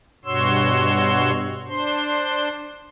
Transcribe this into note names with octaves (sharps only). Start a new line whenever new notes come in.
G2 B2 F#4 C#5 C6 E6
D4 C5 C6